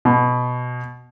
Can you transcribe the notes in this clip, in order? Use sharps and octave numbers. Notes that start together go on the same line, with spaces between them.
B2